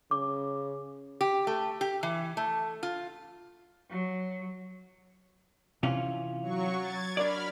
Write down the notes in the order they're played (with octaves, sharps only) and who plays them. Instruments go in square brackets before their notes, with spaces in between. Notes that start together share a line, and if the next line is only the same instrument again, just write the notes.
[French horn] C#3 [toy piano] D6
[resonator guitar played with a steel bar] G4
A3
G4
E3
A3
F4
[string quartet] F#3
[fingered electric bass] C3 [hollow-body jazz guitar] E3 C#4 F4
[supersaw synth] F#3 C#6
G#6 A6
[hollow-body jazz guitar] D4 A#4 D5 [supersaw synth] B5 F6